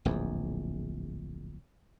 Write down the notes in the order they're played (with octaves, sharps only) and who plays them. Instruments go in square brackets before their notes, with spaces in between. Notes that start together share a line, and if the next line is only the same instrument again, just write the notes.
[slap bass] D1 A#1 E2